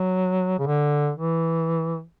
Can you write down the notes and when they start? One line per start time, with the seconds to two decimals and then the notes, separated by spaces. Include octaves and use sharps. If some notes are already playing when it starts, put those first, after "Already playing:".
Already playing: F#3
0.59 C#3
0.67 D3
1.16 E3